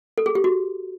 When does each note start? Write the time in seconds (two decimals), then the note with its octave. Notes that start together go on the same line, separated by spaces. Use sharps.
0.18 A4
0.26 G#4
0.35 G4
0.44 F#4